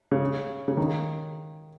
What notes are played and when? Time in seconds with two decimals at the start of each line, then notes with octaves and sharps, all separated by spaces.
0.11 C#3
0.68 C#3
0.77 D#3